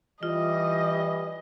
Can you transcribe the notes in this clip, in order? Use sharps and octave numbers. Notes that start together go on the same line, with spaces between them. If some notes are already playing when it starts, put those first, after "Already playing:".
E3 G3 F4 D#5